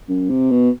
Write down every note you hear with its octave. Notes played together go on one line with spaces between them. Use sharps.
F#2
C3
B2